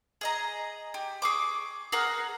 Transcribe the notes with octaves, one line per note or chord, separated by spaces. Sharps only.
G#4 D#5 A#5
G4
G#4 C#6 D6
G#4 A#4 F#5